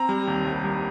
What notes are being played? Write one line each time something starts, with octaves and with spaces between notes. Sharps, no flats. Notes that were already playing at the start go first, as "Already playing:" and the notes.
Already playing: C4 A#5
G3
D#2
C2
G3